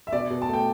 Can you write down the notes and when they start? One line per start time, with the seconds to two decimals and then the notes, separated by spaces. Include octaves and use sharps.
0.07 E5
0.12 B2 D5
0.30 B2
0.42 A5
0.49 A3 G5